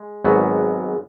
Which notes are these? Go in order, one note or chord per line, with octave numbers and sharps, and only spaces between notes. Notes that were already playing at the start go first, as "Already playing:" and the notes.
Already playing: G#3
G#1 G#2 F#3 B3 F#4